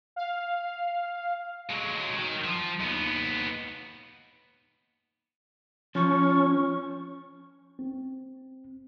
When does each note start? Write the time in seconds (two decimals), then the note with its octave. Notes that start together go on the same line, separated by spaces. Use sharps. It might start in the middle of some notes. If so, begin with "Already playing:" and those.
0.16 F5
1.70 F#3 G#3
2.15 D#3
2.44 F3
2.80 D#2 B3
5.95 F3 C#4 C#6
7.79 C4